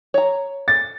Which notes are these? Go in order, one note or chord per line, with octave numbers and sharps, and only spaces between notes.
C#5 A#5
A6